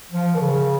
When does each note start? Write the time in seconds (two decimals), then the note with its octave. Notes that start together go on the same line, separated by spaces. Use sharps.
0.12 F3
0.35 D#3
0.41 C#3